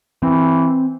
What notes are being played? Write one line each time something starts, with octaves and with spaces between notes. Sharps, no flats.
E3 C4